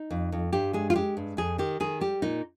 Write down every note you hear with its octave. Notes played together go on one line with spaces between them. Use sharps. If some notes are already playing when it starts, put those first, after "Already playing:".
Already playing: D#4
F2
F2
G2 G4
G#3 G#4
F4
G#3 G4
G2
F2 G#4
D#3 G4
D#3 G#4
G3 G4
A#2 D#4